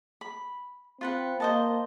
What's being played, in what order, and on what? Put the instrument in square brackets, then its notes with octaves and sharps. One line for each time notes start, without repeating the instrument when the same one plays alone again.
[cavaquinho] B5
[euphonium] C4 [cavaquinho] F4 B4 F#5
[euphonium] A#3 [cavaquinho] C5 D#5 A5